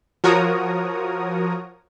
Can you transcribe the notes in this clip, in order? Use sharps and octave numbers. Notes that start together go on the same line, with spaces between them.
F3 F#4 A#4 C#5 A#5 D#6